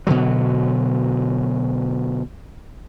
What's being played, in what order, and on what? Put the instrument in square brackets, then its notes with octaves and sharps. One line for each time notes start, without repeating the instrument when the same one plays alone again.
[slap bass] B2 D3 F#3